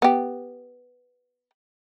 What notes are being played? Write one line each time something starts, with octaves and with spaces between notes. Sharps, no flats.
B3 G4